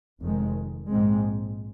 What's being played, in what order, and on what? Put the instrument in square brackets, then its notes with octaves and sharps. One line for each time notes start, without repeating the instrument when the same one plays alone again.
[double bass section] F1 F2 D#3 G#3
A#1 G#2 G#3 C4